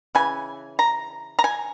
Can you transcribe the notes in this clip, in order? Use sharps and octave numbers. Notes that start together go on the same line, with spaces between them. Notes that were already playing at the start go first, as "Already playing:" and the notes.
C#3 E3 G#5
A#5
A#5
G#5